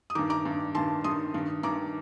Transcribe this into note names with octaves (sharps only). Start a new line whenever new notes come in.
D#6
G2 D#3 A#5 D6
A#5 D6
G2 D#3
G2 D#3 A5 C6
G2 D#3 C6 D#6
G2 D#3
G2 D#3 A#5 D6